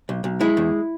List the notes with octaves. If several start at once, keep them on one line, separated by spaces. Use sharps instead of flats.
B1
B1
G#3 E4
E2